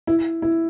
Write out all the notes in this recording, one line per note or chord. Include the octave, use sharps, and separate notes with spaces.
E4
E4